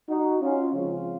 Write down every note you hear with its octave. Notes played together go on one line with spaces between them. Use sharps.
D#4 F#4
C#4 F4
C#3 F3 G#3 C4 C#4 F4